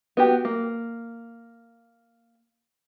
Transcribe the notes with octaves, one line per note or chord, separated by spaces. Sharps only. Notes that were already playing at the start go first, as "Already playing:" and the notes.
B3 F#4 G4
A#3